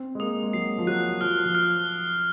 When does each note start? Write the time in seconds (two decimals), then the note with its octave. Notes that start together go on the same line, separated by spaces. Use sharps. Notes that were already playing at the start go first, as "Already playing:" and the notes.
Already playing: C4
0.15 G#3
0.20 A#3 D#6
0.43 G#3
0.53 F#3 C7
0.78 F3
0.87 F#3 F#6
1.21 F3 F6
1.45 F3
1.55 F6